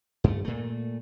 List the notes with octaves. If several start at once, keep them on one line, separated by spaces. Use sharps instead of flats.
G2 A3
A#2 A3